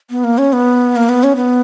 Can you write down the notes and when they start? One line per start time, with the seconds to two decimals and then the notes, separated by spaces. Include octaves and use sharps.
0.10 B3
0.24 A#3
0.38 C#4
0.53 B3
0.96 A#3
1.09 B3
1.23 C#4
1.36 B3